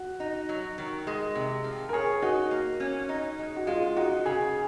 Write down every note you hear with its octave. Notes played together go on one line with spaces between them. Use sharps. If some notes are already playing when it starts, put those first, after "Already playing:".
Already playing: F#4
D#4
F#3
D#3
G#3
C3
F3
A#4
G#4 C#5
D#4 F#4
A#3
C#4
D#4
G#3
F#4
G#3 F4
D#4 F#4
C#3 G#4